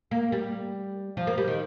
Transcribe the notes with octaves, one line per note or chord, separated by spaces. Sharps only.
A#3
G3
F3
A#3
G3
D#3